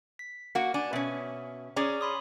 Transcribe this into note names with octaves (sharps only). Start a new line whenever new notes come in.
B6
A#3 F#4 F#5
D4 G#5
B2 C#4 E5
C#4 G#4 C#5 D5 A#5
B5 C6 D#6